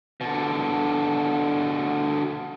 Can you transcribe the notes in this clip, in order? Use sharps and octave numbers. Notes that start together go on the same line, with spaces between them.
B2 D3